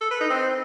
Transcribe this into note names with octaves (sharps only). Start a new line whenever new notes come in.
A4
B4
D#4
C4